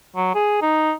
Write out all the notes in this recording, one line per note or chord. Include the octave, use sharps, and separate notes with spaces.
F#3
G#4
D#4